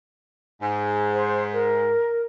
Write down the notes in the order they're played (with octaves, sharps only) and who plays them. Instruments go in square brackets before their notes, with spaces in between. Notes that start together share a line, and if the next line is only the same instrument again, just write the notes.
[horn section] G#2
[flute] C5
A#4